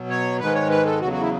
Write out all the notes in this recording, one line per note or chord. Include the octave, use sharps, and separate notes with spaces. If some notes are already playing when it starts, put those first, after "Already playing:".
Already playing: B2 F#3
C#5
G#2 D#3 G#3 B4
C#5
B4
A4
E2 C#3 F#3 F#4
F#4
E4